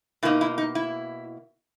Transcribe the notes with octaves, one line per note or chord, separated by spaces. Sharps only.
B2 A#3 D#4 E4
E4
D#4
E4